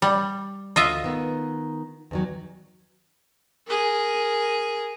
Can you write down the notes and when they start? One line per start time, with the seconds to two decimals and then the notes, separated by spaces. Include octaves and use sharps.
0.02 G3
0.76 D2 F4 D#5 E5
1.04 D#3 B3
2.11 E2 D#3 F#3
3.66 G#4 A#4